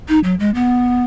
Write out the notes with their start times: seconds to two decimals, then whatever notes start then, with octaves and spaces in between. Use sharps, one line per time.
0.09 D#4
0.24 F#3
0.40 G#3
0.55 B3